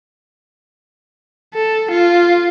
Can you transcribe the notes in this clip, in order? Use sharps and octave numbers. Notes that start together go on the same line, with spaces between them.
A4
F4